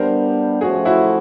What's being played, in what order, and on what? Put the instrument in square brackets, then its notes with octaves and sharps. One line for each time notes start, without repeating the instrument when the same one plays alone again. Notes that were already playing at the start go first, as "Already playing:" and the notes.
Already playing: [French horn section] G3 B3 D4 [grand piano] A#4 C5
[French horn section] F3 A3 C#4 [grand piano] F#4 G#4
[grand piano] E4 F#4